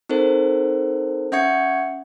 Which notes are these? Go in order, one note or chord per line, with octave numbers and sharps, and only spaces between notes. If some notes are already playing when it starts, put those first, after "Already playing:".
C4 D#4 A4 A#4 C5
C#4 E5 F#5 C#6 G#6 C#7